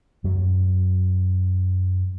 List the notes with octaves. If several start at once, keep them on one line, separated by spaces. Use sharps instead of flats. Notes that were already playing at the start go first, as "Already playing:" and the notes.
F#2 F#3